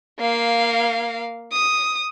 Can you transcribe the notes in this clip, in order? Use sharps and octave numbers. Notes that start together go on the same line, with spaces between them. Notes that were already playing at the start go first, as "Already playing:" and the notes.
A#3 F5
D#6